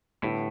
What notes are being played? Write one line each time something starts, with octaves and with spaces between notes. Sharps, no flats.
A2 D3 G3 B3 E4 G4